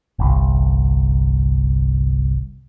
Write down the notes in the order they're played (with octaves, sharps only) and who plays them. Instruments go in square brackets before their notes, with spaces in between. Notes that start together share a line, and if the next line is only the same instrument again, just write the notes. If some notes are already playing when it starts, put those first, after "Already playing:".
[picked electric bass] G1 C2